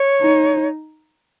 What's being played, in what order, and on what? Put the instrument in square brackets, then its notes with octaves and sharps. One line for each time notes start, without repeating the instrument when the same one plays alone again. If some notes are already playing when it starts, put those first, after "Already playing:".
Already playing: [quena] C#5
[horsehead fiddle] D#4